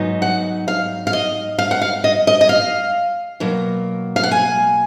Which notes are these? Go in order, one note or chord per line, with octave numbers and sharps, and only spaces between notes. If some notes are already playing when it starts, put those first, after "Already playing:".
Already playing: G#2 F#3 B3 D#4
F#5
F5
F5
D#5
F5
F#5
F5
D#5
D#5
D#5
F5
B2 F#3 A#3
F5
F#5
G#5